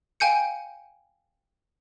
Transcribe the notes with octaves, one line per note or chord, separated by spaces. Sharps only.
F5 G5 G#5 G6 C#7